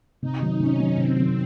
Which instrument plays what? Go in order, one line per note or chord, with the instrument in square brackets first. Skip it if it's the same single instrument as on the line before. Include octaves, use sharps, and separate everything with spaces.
[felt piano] C3 [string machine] D#4
[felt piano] D#3 F#3
[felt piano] C3 [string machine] C#4
[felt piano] D#3 F#3
[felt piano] C3 [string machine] C4
[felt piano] D#3 F#3